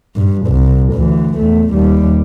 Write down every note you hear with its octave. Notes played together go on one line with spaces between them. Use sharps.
G2
C2
D2 E3
E2 A3
D#2 G3